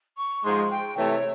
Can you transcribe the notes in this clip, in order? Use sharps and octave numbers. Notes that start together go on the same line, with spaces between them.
C#6
G#2 F3 G#3 C6
G5
C3 E3 A3 C#5